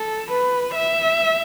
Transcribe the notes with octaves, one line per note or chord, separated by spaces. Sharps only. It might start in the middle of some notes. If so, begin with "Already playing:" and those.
Already playing: A4
B4
E5